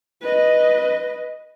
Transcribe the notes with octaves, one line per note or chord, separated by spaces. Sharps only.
B4 D#5